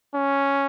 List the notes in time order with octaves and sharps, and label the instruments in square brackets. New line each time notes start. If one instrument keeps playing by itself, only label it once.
[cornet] C#4